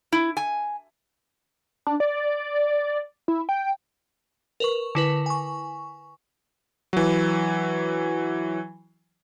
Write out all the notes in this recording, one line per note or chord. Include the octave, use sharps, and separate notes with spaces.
E4
G#5
D4
D5
E4
G5
A#4 B4 C#6
D3 E4 B4
G#5 C#6
E3 F#3